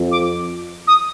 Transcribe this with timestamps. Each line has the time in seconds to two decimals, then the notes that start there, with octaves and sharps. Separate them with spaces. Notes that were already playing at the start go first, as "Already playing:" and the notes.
Already playing: F2
0.12 D6
0.87 D#6